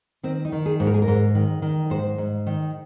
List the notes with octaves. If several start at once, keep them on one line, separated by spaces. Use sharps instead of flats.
D#3 C4
D#4
D#3
G#4
G#2
A#4
G#4
A#4
G#2
D#3
D#3
G#2 C5
G#2
D#3